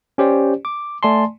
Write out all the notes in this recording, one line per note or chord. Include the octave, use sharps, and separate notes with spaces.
C#4 G4 C5 D5
D6
A3 D5 G#5 A5 C6